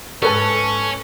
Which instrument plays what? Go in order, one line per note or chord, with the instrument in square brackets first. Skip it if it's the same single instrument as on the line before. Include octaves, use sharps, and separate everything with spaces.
[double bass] G#2 [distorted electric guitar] C#4 [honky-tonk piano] A4 B4 A5 [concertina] C#6